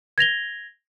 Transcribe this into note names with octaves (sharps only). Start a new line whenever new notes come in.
G#6 A#6 F7 G7